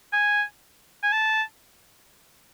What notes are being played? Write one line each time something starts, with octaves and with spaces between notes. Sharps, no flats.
G#5
G#5
A5